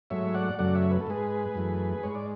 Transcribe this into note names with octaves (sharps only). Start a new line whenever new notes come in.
G#2 F#3 A3 C#5 E5
D5 F#5
F#2 C#3 F#3 A3 D5 F#5
C#5 E5
B4
A4
G#2 G#3 G#4 B4
F#2 E3 A3
G#2 G#3 C#5
D5